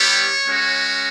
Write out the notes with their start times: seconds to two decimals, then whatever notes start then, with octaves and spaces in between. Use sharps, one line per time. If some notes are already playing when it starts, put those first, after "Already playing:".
Already playing: G3 B3 E4 G4 C#5
0.47 G#3 C#4 F#4